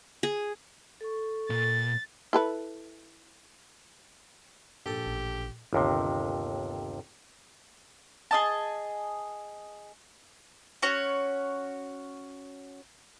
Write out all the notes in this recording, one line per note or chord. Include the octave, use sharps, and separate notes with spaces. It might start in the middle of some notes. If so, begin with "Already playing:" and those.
G#4
A4 C#6
A#2 A6
E4 A4 B4
A#1 G#2 G4 A4 D#6
A1
G1 D#2 C3
G#4 D#5 A5
C#4 F#4 C#5